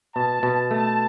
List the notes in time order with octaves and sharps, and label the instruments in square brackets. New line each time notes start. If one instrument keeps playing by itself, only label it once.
[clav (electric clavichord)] B2 [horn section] A5
[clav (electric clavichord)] B2
[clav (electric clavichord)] A3 [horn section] A5